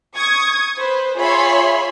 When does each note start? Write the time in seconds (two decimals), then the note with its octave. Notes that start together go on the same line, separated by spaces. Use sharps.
0.15 C#6 D#6 G#6
0.78 B4 C5
1.17 F4 G#4 C#5 E5 B5 C6